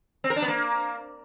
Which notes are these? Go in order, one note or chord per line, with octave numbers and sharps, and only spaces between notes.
C4
A#4
D4
B3
A#3